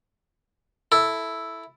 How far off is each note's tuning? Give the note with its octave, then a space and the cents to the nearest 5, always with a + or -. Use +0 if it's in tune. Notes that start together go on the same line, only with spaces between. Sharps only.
E4 +0 A4 +0